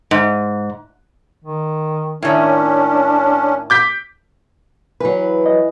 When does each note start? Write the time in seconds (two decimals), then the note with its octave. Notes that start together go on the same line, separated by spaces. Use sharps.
0.11 G#2
1.45 D#3
2.22 A2 D#3 C#4 D4
3.70 D6 G6 B6
5.00 E3 F#3 B4
5.46 D#5